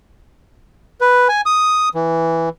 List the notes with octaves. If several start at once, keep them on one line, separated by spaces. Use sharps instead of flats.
B4
G#5
D#6
E3